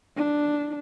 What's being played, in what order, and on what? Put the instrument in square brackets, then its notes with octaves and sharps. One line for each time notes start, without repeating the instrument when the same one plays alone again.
[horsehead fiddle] D4